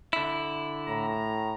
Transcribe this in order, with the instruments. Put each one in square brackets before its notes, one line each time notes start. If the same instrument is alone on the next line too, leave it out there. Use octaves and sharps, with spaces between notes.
[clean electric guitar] D3 E4
[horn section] A2 A#5